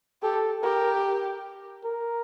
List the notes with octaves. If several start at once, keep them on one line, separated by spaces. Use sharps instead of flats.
G4 A4
G4 A#4
A#4